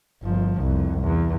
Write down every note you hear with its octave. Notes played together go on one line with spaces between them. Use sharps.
G1 F3
C2 F2
E2